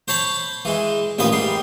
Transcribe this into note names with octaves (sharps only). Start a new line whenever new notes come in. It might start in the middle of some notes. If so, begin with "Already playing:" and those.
C5 C#5 A5 B5
E3 G#3
A1 D#2 F3 B4 D#6
G#2 G3 C6